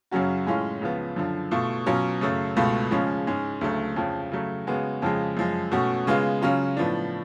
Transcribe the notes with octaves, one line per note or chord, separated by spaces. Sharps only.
F#2 C#3 F#3 C#4 F#4
A2 G#3 C#4 F4
C#2 C#3 F3 B3
F#2 D3 F3
B2 A3 F4
B2 F#3 C#4 F4
F#2 C#3 F#3 A3
C#2 B2 A3 F4
C#3 F3 G#3 C#4
G#2 G#3 C#4
D2 C#3 F#3 A3
F2 C#3 F3
C#3 F#3 A3
C#3 G#3 B3 F#4
F2 C#3 F3 G#3
F#2 F3 G#3
B2 A3 C#4 F#4
C#3 G#3 B3 F4
C#3 F#3 C#4 F4
A2 F3 B3 D4